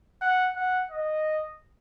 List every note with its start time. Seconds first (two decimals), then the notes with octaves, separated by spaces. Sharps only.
0.21 F#5
0.56 F#5
0.91 D#5